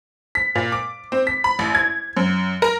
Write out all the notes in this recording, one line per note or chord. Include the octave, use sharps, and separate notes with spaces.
B6
A#2
D6
C4
B6
B5
A1
G#6
F#2
A#4